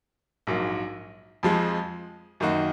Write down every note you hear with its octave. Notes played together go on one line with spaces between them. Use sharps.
A#1 G#2 F#3 A#3
F2 F3 G#3
F#2 D#3 A#3 D#4 F#4